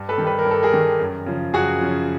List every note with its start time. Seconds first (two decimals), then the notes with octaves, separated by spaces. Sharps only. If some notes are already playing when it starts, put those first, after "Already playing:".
Already playing: G2
0.09 A4 B4
0.18 D#3 G3
0.27 B4
0.39 A#4
0.45 G2
0.51 A4
0.63 G#4 A#4
0.72 D#3 G3
0.99 F#2
1.26 C#3 F3
1.53 F#2 F#4 G#4
1.80 C#3 F3